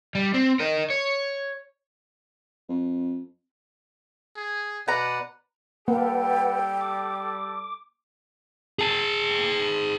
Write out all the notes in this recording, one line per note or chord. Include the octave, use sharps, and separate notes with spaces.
G3
C4
A#4 D#5
C#5
F2
G#4
B2 B4 D5 F#5 A#5
G3 A#3 A4 B4 F#5 G5
D6
G#4 A5